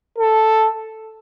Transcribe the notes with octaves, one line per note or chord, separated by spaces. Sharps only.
A4